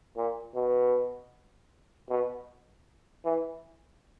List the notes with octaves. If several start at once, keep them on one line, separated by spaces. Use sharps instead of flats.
A#2
B2
B2
E3